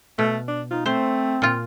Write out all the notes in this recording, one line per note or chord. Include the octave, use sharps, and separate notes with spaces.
B2 A3
D4
D#4 F4
A3 C4 C5
A#2 F4